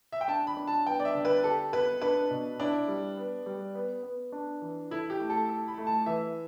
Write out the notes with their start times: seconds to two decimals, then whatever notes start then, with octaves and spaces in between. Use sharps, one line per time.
0.12 E5
0.21 G5
0.28 D4 A5
0.47 B5
0.57 D4
0.67 A5
0.86 B3 G5
1.00 D5
1.05 E5
1.15 D3
1.25 B4
1.44 G4 A4
1.73 B3 B4
2.02 D4 B4
2.31 B2
2.59 D4 E4
2.88 G3
3.17 B3
3.46 G3
3.75 B3
4.03 B3
4.32 D4
4.62 E3
4.91 E4 A4
5.10 G4
5.20 A3
5.30 A4
5.49 A4
5.68 B5
5.78 A3
5.87 A5
6.06 E3 E5